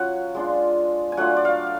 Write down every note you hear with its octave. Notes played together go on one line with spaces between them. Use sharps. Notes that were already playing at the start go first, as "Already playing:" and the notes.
Already playing: F#3 C#4 F4 F#5 G#5
G#3 D4 F4
G#5
F#3 A3 D4 F4 F#5
D5
F5